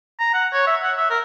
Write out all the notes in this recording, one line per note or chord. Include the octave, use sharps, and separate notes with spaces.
A#5
F#5
C#5
E5
F#5
E5
A#4